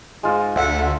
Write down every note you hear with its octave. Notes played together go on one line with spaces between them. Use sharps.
G#2 G#3 F4
D2 E5 F#5